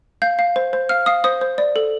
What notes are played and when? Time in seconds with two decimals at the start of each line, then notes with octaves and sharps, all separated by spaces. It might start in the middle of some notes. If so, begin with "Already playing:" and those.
0.22 F5 G6
0.39 F5
0.56 C5
0.73 C5
0.89 F5 F6
1.06 F5 D#6
1.24 C5 D#6
1.41 C5
1.58 D5
1.76 A4